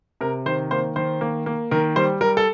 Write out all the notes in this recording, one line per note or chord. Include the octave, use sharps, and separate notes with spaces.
C3 A#4
D#3 C5
A#3 C5
D#3 C5
A#3
A#3
D#3 A#4
G3 C5
G3 A#4
A4